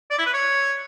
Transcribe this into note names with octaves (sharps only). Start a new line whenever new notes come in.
D5
E4
B4
C#5